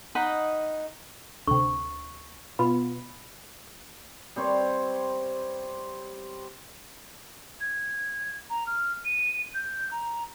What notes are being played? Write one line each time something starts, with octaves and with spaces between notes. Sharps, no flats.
D#4 D#5 F#5 B5
D2 C3 C#6
B2 B3 F4 B5
G3 C4 C5 C#5
G#6
A#5
F6
D#7
G6
A#5